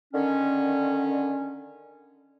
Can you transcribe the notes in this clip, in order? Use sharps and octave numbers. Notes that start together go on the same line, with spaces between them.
D3 D#3 C#4